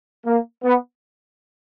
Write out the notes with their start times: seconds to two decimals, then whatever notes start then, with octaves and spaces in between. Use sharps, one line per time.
0.25 A#3
0.64 B3